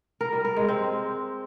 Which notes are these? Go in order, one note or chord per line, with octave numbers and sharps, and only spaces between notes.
A#4
G3
A#4
G#3
C4